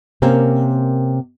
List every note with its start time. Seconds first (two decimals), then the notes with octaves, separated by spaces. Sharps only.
0.22 C3 A#3 C4 C#4 A#4